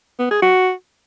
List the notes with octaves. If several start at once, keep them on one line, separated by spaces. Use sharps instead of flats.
B3
G#4
F#4